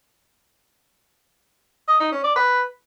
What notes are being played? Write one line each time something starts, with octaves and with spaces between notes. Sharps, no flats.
D#5
D#4
C#4
D5
B4